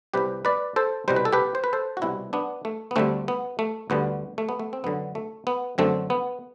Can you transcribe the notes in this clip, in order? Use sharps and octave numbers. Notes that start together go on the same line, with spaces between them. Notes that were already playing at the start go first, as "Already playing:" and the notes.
C2 C3 G3 G4 B4
B4 D5
A4 C5
C2 B2 G3 C5
B4
A4
G4 B4
C5
B4
A4 C5
F#4
C2 B2 G3 C4 E4
B3 D4
A3
B3
D2 D3 G3 A3 C4
B3
A3
D2 D3 G3 B3
A3
B3
A3
C4
F#2 D3 F#3 B3
A3
B3
F#2 D3 F#3 A3 C4
B3